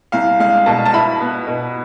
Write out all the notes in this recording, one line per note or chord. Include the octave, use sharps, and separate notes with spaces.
C2 F5
G#3 F5
B2 A5
A5
E4 B5
B3
B2